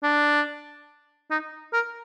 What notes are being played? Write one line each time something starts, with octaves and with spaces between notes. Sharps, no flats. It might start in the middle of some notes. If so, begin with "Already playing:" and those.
D4
D#4
A#4